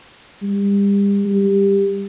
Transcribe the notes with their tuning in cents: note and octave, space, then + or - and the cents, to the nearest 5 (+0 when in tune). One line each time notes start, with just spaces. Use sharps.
G3 +35
G3 +15